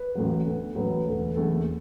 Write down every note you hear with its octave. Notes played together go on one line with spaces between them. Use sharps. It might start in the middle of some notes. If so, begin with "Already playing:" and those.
Already playing: B4
A1 A2 F#3
D2 D3 B3
A1 A2 F#3 B4
B4
E1 D2 D3 A3
F#1 E2 D3 A3 A4